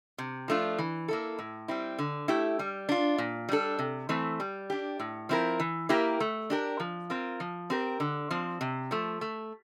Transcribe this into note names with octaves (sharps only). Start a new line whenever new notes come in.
C3
F3 A3 D4 F4
E3
A#3 E4 A4
A2
G3 C4 E4
D3
A3 E4 G4
G3
D4 F4
A#2
G3 D4 A4
C3
E3 A3 C4
G3
D4 G4
A2
F3 C4 E4 A#4
E3
A#3 E4 G4 A#4
A3
D4 G4 A#4
F3
C4 F4 A#4
F3
C4 G4 A#4
D3
F3 C4
C3
F3 A3
A3